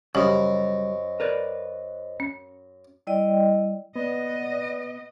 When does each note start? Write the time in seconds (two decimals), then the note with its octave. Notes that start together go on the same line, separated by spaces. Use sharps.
0.15 F#2 C#3 G3 G4 C5 D#5 D#6
1.20 A#4 B4 D5
2.20 C#4
3.07 G3 E4 D5 D#5 G5
3.95 B3 D5 D#5